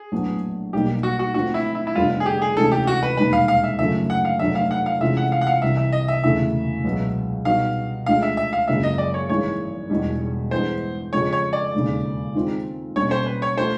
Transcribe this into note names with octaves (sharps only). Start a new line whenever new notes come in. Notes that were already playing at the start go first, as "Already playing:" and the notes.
Already playing: G#4
A#1 A2 F#3 B3 D4
B1 B2 G3 A#3 D#4 G4
F#4
F#4
D3 F3 A3 C4 F4 F#4
E4
E4
E4
F1 F2 D3 G3 B3 F4
G#4
G4
G#4
D2 C3 E3 G#3 C#4 A4
G4
F#4
B4
E1 D#2 D#3 G3 B4
F5
F5
E5
F#2 C#3 F3 A3 D4 E5
F#5
F5
F1 F2 D3 F#3 E5
F5
F#5
F5
C3 E3 G#3 C#4 F4 E5
F#5
F5
F#5
F5
C2 C3 E3 E5
E5
D#5
E5
E1 E2 C#3 E3 A3 E5
C#2 B2 F#3 B3
B2 G3 B3 D#4 F#4 F5
D2 D3 F3 G#3 F5
E5
E5
F5
F#1 F#2 C#3 F3 G#3 E5
D#5
D5
C#5
G#1 G2 E3 G#3 C#5
E1 E2 B2 G3
G2 E3 G#3 B3 C5
F2 C#3 F3 G#3 C#5
C#5
D5
E1 D#2 C#3
D#3 G#3 C4 F4
B2 G3 A#3 C#4 C#5
C5
B4
C#5
F3 A3 C5